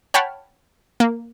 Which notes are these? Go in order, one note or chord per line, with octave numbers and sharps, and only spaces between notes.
C#5 F#5 G5 A5 B5 F6
A#3